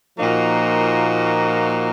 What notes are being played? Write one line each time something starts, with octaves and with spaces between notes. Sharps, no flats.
A#2 F3 A#3 D#4 F#4